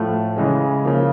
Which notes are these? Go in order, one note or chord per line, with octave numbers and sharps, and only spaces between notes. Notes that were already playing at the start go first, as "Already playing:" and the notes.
Already playing: A2 F3 A3
C#3 E3 G#3 C#4
C#3 F3 A#3